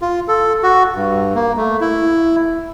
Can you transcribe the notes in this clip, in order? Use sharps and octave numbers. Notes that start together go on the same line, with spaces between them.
F4
A4
F#4
G2
A#3
A3
E4